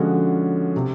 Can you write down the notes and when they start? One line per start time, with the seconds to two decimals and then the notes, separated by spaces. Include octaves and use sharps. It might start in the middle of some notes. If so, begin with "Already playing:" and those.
Already playing: D3 F3 G#3 C#4 F#4
0.76 C3